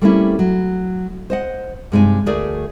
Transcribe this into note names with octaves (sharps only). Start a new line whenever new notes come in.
G3 A3 A#3 C4 C#4 E4
F#3
C5 D#5 F#5
G2 C3 G#3 D#4 D5 G#5
D2 A3 G#4 A#4 D5